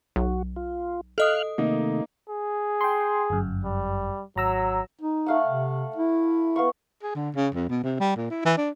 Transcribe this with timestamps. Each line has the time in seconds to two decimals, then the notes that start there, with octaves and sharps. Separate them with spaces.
0.16 B1 F#4
0.56 F4
1.18 A4 D#5 F5 D#6 F6 F#6
1.58 C3 D#3 A3 A#3 D#4
2.29 G#4
2.81 G5 C6
3.30 G1 F#2
3.64 G3
4.36 G#1 F#3 A#5 E6
5.02 D#4
5.26 A3 F5 F#5
5.46 C3
5.96 E4
6.56 B3 F5 C#6
7.03 G#4
7.15 D3
7.35 C#3
7.55 F2
7.70 B2
7.83 C3
8.00 G3
8.16 A#2
8.30 E4
8.45 E3
8.57 D4